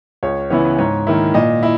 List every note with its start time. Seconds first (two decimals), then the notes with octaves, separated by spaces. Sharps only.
0.23 C#2 C#5
0.50 C#3 E3 B3 E4 C#5
0.65 B4
0.78 G#2 C#5
1.07 D#3 A#3 E4
1.34 A#2 D#5
1.63 E4